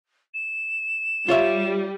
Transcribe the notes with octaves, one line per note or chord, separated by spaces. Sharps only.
E7
G3 F4 C#5 E5